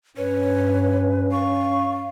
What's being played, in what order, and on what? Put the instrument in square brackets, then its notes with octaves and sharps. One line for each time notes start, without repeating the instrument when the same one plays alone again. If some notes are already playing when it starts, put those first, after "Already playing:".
[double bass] G2 [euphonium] C#4 [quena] B4 [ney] C#5
[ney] F5 [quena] C#6